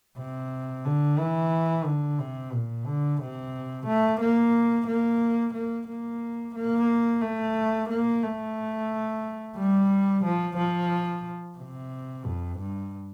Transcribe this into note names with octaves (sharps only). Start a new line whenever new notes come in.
C3
D3
E3
D3
C3
A#2
D3
C3
A3
A#3
A#3
A#3
A#3
A#3
A3
A#3
A3
G3
F3
F3
C3
F2
G2